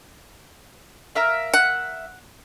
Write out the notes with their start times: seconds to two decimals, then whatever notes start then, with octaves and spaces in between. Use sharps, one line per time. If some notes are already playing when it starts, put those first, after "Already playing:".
1.15 A#4 E5 F5
1.54 F#5